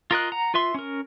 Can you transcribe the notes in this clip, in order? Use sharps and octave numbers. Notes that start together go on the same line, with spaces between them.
F4 A#4 D#5 F#6
F#5 A#5
F4 B4 E5 C6
C#4 A#4